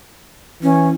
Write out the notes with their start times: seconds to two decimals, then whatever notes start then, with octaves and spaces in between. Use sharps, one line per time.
0.63 E3 C#4